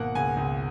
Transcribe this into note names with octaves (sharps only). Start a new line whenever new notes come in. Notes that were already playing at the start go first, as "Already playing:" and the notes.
Already playing: G#1 B2 A#3 F#5
C#2 G#5
C#2